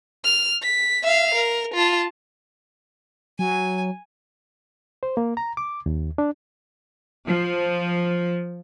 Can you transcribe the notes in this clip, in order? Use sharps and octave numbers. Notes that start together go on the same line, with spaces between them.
F6
B6
E5 F5
A#4
F4 A5
F#3 G#5
C5
A#3
A#5
D6
D#2
D4
F3